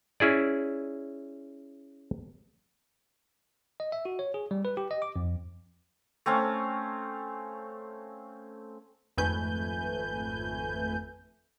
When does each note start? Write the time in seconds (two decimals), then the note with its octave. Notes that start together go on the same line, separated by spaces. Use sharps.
0.20 C#4 E4 G#4 D5
3.80 D#5
3.92 E5
4.05 F#4
4.19 C#5
4.34 G#4
4.51 G3
4.65 B4
4.77 G4
4.91 D#5
5.02 D6
5.16 F2
6.26 A3 C4 C#4 F5
9.17 G#1 F2 A3 B4 G#5 G6